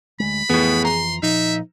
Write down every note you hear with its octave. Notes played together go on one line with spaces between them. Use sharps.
D2 G#3 B5
F2 A2 E3 F3 B3 G#4
A#5 C6
A#2 F3 D#4 E5